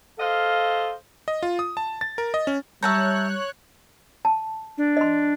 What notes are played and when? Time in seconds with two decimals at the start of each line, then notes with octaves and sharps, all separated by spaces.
0.19 A4 C5 D#5 F5
1.28 D#5
1.43 F4
1.59 D#6
1.77 A5
2.01 A6
2.18 A#4
2.34 D#5
2.47 C#4
2.83 G3 C#5 E5 A5 A#5 F#6 G6
4.25 A5
4.78 D4
4.97 D#5 C6